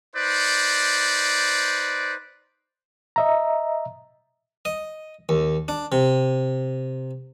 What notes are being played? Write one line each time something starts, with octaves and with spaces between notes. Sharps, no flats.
D#4 B4 C5 D5
D#5 E5 A#5
D#5
D#2
D4
C3